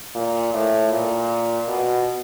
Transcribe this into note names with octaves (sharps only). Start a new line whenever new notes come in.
A#2
A2
A#2
B2